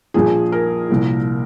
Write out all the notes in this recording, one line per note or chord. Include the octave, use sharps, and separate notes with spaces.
A#1 A#2 F3 G#4
A#4
C2 A#2 F3